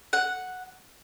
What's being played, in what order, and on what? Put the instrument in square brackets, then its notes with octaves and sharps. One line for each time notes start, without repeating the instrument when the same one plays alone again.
[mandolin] F#5